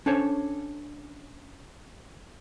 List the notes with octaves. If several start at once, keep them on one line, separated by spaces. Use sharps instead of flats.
C#4 D4 A4 C5 C#5